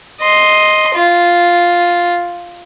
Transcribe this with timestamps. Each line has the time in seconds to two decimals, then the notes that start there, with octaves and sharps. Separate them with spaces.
0.20 D#5 C6
0.95 F4